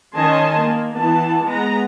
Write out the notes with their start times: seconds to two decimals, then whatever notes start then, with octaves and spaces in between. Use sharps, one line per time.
0.16 D#3 C#4 D#5 G#5 A5 C6
0.62 A#3
0.96 E3 B3 A5
1.44 G#3 B3 A#5